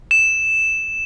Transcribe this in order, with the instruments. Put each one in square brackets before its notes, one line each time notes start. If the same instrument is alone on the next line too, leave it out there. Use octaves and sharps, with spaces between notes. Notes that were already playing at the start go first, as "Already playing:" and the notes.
[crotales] E7